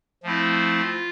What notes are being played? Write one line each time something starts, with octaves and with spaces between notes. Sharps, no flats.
F3 A3 C4 E4
F4